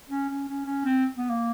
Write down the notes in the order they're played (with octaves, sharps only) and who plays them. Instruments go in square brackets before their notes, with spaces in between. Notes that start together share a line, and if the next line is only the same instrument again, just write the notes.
[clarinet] C#4
C#4
C#4
C#4
C4
B3
A#3